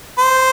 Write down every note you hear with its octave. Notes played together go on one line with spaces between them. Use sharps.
C5